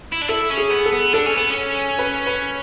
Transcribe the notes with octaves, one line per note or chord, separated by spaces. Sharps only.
E4
D4
E4 A4
C#4
G#4
B3
A4
B3
D4 A4
C#4
B3
C#4
B4
B4